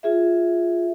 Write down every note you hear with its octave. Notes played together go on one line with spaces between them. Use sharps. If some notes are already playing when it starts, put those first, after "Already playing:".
F4 G#4 E5